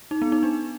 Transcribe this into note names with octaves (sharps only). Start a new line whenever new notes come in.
D#4
B3
D#4
D4